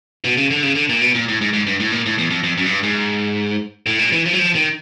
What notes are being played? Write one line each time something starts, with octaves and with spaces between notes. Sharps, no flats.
B2
C#3
D3
C#3
D3
A#2
B2
A#2
A2
G#2
G#2
G2
A2
A#2
A2
E2
F2
F2
F#2
G#2
G2
G#2
A2
A#2
E3
F3
F#3
F3
D#3